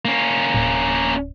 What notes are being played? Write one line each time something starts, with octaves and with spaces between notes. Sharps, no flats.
A#3 C#4
D1